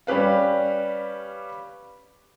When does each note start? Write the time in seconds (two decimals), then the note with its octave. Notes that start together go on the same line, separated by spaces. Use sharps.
0.07 G3 C#4 G4 B4 F5